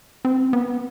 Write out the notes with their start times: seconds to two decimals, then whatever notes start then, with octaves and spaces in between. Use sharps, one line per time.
0.25 C4
0.53 B3